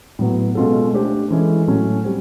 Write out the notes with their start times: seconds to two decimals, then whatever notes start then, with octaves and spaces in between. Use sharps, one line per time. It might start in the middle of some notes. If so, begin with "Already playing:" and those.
0.19 A2 F#3 B3
0.55 B2 G#3 C#4 F4 A4
0.92 A3 D4 G4 C5
1.30 E3 G#3 C#4 E4 A4
1.67 A2 F#3 A3 C#4
2.04 G3 C4